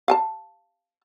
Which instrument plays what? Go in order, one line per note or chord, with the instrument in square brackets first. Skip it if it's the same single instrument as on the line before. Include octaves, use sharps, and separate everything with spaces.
[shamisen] F5 G#5 A5